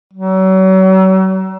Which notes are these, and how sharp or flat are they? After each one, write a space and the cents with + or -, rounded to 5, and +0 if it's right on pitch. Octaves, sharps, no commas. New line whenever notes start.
F#3 +40